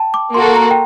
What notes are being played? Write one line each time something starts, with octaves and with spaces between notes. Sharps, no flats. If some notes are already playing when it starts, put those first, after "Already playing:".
Already playing: G5 A5
D6
A#3 F#4 A4 C6
A#5
G5